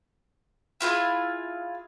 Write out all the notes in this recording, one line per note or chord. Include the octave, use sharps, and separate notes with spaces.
E4 F4 G4 G#4